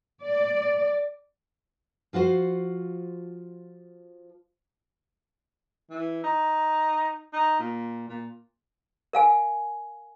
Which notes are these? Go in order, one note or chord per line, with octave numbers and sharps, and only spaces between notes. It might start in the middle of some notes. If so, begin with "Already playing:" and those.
D5
F3 F4 F#4 C5
E3
D#4
D#4
A#2
A#2
A#4 F5 G#5